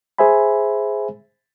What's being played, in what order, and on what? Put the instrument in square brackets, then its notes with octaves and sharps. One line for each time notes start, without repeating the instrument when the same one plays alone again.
[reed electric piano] G#4 C5 E5 G#5 B5